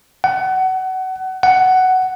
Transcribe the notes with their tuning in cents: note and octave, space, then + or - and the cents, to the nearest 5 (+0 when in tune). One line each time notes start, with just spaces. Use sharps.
F#5 +25
F#5 +10